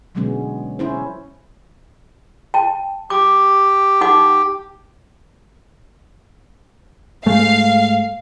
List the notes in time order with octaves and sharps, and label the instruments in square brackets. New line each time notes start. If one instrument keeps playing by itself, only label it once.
[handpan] B2 D3 F#3 G#3 B3 C#4
C#4 E4 C5
[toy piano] G5 A5
[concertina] G4 [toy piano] D6
[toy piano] D#4 F#5 D6
[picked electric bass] G#2 G#3 A3 [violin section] F5